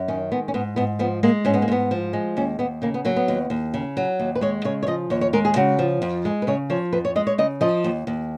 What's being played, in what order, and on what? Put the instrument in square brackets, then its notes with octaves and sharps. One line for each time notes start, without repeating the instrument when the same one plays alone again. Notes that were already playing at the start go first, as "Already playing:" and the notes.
Already playing: [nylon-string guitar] F#2
D#3 C#4
G#3 B3
C#4
G#2 B3
G#2 B3
F3 B3
G#3 A#3
G#2 C#4
B3
A#3
G#2 B3
F3
G#3
D#2 C#4
D#2 B3
C#3 A#3
B3
F#3 A#3
B3
D#2
D#2
C#3
F#3
D#2
B4
G#3 C#5
C#3 C#5
C#5
F3 D#5
D#2 C#5
C#5
G#3 A#4
G#4
C#3 F#4
F3
F2
G#3
B4
C#3 C#5
F3 C#5
F2 B4
C#5
G#3 D#5
C#5
C#3 D#5
F3 D#5
D#2
D#2